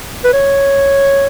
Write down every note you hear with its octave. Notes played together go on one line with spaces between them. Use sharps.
B4
C#5